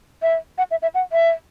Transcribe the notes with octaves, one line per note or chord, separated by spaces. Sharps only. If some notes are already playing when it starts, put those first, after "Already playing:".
E5
F#5
E5
E5
F#5
E5